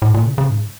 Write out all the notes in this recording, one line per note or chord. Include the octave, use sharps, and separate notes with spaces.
A2
A#2
C#3
C#3
G#2